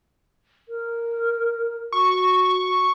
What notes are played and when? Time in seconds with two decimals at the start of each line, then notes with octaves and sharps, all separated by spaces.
0.69 A#4
1.92 F#4 C#6